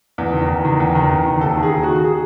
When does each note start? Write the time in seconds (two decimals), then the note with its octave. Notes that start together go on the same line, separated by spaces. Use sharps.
0.18 E2
0.33 D#3
0.48 E2
0.65 D#3
0.80 E2
0.95 D#3
1.11 E2
1.26 D#3
1.41 D#2 A4
1.57 D#3
1.63 G#4
1.73 D#2
1.83 F#4
1.89 D#3
2.04 G#4